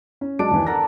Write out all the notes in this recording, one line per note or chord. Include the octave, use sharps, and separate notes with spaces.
C#4
F#3 G#3 D4 D7
D#2 E3
A4 A#4 F#5 A#6